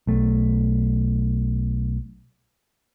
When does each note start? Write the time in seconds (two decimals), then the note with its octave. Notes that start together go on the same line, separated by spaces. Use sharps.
0.07 B1 A3